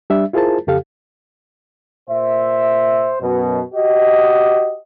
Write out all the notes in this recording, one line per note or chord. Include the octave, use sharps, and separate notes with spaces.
G3 D4 E5
E4 F4 G#4 A#4 C5 A5
F2 C#3 G4 A4 F5
A#2 C5 E5
F#2 B2
F#4 G4 D#5